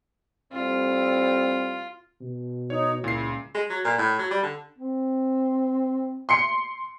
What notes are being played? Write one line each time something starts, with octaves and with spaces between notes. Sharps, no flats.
A2 G3 C4 F4
B2
D#4 C#5
C#2 A#2 E4 C7
G#3
F#3
A#2
A2
F#3
G3
D3
C4
C6 C7 C#7